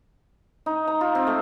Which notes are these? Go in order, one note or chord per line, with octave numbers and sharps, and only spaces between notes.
D#4
A#5
F4
C4
A3